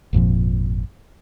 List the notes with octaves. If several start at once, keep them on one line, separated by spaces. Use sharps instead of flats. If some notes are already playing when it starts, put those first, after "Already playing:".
G#1 F2 A#2 F3